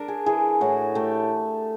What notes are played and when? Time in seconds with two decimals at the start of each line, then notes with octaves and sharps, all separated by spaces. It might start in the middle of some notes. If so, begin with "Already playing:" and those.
Already playing: D4 A#4
0.08 G#4
0.26 E3 G#4
0.61 A2 F#4
0.95 A3 G4